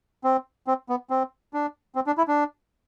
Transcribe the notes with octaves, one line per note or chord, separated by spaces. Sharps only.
C4
C4
B3
C4
D4
C4
D4
E4
D4